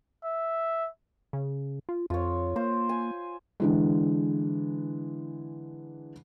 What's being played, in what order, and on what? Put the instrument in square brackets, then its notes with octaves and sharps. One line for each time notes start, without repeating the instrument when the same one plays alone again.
[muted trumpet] E5
[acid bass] C#3
F4
[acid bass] F2 [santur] F4 C#5
[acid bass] A#3 [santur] C5
[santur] G#5
[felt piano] D3 E3 G#3